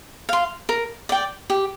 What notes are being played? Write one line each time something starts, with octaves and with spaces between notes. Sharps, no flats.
F5 C6
A#4
D5 G5
G4